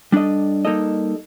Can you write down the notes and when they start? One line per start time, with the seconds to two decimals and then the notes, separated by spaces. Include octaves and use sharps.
0.12 G3 D4 A4 D#5
0.65 G3 A#3 D#4 A4 D#5